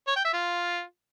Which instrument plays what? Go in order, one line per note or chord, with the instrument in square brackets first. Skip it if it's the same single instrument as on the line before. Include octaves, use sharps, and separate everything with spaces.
[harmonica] C#5
G5
E5
F4